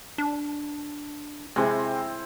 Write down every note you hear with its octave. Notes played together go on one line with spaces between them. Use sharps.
D4
C3 G#3 C4 E4